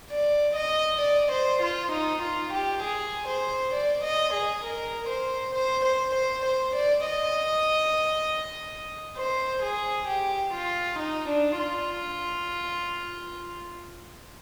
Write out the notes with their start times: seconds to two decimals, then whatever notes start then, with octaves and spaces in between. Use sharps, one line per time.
0.11 D5
0.56 D#5
1.01 D5
1.32 C5
1.62 F4
1.92 D#4
2.22 F4
2.53 G4
2.83 G#4
3.28 C5
3.74 D5
4.03 D#5
4.34 G#4
4.64 A#4
5.09 C5
5.55 C5
5.85 C5
6.15 C5
6.46 C5
6.75 D5
7.06 D#5
9.17 C5
9.63 G#4
10.08 G4
10.54 F4
10.99 D#4
11.29 D4
11.59 F4